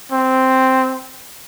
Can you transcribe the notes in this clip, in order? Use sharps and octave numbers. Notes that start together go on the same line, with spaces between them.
C4